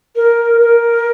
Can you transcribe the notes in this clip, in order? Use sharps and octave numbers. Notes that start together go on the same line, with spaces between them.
A#4
A#4